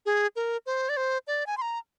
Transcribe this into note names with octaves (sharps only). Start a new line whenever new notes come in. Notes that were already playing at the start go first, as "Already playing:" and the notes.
G#4
A#4
C5
D5
C5
D5
G#5
C6
A#5